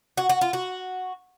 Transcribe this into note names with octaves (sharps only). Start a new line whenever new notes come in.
F#4
F#4
F4
F#4